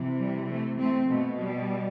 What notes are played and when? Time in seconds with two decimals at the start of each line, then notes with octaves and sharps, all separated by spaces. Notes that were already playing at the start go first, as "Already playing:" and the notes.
Already playing: C3 E3
0.18 G3
0.48 A3
0.78 A3 C4
1.08 B2 A3
1.38 G3